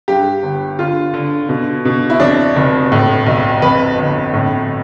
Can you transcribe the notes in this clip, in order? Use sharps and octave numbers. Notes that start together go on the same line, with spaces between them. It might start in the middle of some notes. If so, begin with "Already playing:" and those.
G2 G4
G1
D3 F4
D3
B2
B2
E4
F2 D4
F1
A2
B1
F2 B4
G1
A2